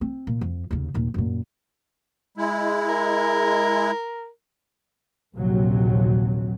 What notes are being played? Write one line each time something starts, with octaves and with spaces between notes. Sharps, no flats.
C4
A#2
F2
D#2 C#3
D#2 A#2
F#2 A#2
G#3 E4
A#4
A#1 D#2 C3 F#3